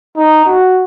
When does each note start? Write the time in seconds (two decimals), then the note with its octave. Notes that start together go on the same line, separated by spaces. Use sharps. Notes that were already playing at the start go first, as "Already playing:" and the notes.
0.16 D#4
0.45 F#4